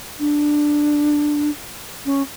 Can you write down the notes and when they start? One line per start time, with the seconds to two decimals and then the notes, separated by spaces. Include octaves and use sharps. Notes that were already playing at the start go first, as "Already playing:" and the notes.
0.19 D4
2.05 C#4